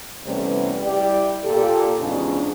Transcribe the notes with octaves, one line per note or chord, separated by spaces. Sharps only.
C3 E3 G3 A3 B3 C#4
G3 E4 G4 D5
A#2 G4 A4
E2 G#2 C#3 F3 D4